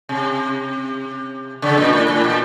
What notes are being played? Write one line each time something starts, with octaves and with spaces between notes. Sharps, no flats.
C3
C#3
A#2
A2
A2
A#2